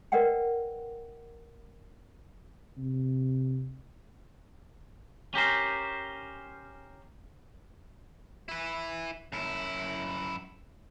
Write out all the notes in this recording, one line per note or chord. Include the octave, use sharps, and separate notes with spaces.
A#4 B4 D5 D#5 F#5 G5
C3
C#4 G4 A#4 C5
E4 B4
F#2 E4